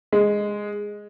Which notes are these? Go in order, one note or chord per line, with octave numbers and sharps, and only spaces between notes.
G#3